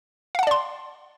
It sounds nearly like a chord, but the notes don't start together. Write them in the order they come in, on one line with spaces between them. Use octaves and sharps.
F5 F#5 A5 D5 C6